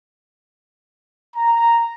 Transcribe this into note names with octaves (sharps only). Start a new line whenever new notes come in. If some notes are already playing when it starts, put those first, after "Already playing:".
A#5